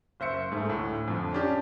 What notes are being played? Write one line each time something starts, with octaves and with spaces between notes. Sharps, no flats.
F#1 C5 E5 C#7
G#2 A3
D2 A2
F2 D3 F3
C#4 D4 G4